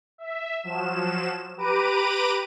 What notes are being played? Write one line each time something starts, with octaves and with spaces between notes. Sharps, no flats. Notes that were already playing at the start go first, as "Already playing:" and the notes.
E5
F3 F#3 E7
G4 B4 A#5 D6 D7 D#7